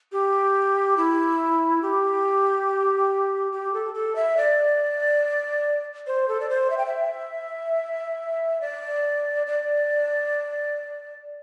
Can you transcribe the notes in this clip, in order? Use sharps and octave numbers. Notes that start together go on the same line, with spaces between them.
G4
E4
G4
G4
A4
A4
E5
D5
C5
A4
D5
C5
E5
G5
E5
D5
D5